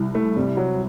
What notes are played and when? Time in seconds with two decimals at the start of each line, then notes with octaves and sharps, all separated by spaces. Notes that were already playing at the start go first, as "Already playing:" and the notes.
Already playing: C2
0.15 A3
0.36 C3 G3
0.57 F#3